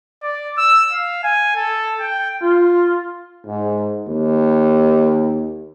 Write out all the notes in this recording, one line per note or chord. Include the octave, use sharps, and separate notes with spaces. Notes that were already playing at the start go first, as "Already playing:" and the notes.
D5
E6
F5
G#5
A4
G5
F4
G#2
D#2